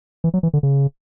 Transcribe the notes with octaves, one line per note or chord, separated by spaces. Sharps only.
E3
F#3
E3
D3
C#3